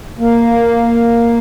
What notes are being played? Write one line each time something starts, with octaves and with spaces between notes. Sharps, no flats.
A#3